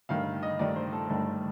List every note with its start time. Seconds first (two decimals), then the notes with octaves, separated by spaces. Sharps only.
0.09 G1 G2 D#3 A3 F5
0.43 D#5
0.59 G1 G2 D#3 A3 D5
0.76 C5
0.93 A4
1.09 G1 G2 D#3 A3 A4